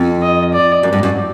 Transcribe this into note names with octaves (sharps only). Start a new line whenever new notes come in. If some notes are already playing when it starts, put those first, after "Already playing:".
Already playing: F2
D#5
D5
F#2
G2
F#2